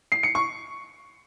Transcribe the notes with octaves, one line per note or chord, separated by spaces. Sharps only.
C7
C#7
C#6